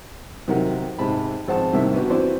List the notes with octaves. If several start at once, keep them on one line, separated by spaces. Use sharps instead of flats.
C3 D#3 F#3 A#4 F#5
G#2 C3 A5 B5
G#1 F3 C4 F#5 A5
C2 C3 D#3 A#3 E5
B3 C4 D4 F#4 G4
E3 C4 E4 F#4 C5 D5